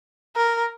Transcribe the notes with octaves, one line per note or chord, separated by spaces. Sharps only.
A#4